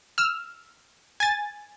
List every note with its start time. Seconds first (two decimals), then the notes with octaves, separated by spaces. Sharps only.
0.18 E6 F6
1.20 G#5 A6